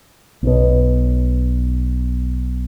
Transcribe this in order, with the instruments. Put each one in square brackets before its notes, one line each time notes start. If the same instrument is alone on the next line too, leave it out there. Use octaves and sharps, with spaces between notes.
[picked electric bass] B1 B2